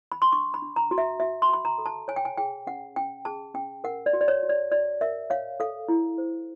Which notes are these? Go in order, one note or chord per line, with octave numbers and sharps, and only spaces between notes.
B5
C6
D4 C#6
B5
D4
A#5
F#4
E5
F#4 E5
C6
F#4 B5
A#5
A4
A5
C#5 G#5
G5
G#5
G#4 G5
C#4 F#5
C#4 G5
G#4 A5
C#4 G5
A#4 F#5
D5
F#4
D5
C#5
F#4
D5
F#4 D5
A#4 E5
C#5 F5
A4 F5
E4
C5